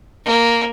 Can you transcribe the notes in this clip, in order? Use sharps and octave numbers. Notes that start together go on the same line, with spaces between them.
A#3